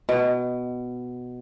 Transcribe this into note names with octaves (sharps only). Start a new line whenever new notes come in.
B2